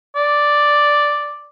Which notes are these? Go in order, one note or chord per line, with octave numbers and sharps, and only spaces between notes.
D5